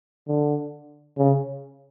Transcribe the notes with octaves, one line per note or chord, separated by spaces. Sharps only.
D3
C#3